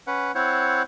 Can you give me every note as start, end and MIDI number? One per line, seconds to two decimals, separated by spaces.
0.07 0.32 61
0.07 0.32 71
0.07 0.32 78
0.35 0.82 60
0.35 0.82 64
0.35 0.82 72
0.35 0.82 73
0.35 0.82 78